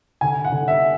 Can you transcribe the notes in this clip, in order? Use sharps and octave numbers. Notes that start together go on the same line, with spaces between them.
D3 G#5
F#5
D3
E5